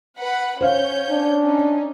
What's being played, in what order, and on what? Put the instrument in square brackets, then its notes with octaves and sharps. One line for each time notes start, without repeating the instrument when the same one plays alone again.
[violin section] B4 F#5 B5
[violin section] C#4 C#5 G6 [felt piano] C5 F5
[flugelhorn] D4
[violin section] C#4 D#4